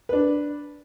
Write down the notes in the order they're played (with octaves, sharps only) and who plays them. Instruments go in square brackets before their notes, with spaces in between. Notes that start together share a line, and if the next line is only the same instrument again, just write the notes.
[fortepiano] D4 B4